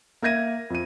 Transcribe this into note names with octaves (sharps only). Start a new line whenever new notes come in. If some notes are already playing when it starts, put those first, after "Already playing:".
A#3 A#4 E5 G#6 A#6 D#7
F2 D#7